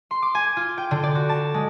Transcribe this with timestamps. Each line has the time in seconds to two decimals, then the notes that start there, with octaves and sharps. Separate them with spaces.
0.11 C6
0.22 D6
0.35 G#5
0.57 F4
0.78 G5
0.91 D3
1.03 D5
1.15 F#4
1.29 A5
1.54 G#3